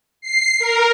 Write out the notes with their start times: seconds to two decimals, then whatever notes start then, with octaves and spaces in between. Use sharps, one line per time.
0.21 C7
0.59 A#4